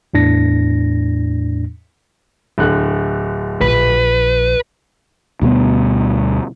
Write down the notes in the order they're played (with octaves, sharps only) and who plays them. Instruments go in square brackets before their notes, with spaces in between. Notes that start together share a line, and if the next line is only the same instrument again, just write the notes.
[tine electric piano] E2 A2 D4 A#6
[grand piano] D1 D3 F#6
[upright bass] A#1 [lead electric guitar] B4
[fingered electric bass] D2 B2 G3 B3